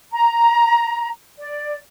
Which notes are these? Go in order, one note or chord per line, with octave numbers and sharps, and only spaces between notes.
A#5
D5